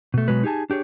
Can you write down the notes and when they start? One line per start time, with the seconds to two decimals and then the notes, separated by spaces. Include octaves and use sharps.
0.14 B2 A3
0.28 B2 F#3 G#3 B4
0.43 D#4 G4 G#4 G#5 A5
0.70 D4 G4 G#4 C#5